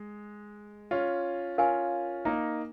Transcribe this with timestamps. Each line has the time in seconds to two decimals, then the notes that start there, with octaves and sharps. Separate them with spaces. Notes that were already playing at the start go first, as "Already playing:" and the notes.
Already playing: G#3
0.91 C#4 F4
1.58 C#4 F4 A#4 F5 G#5
2.25 A#3 D#4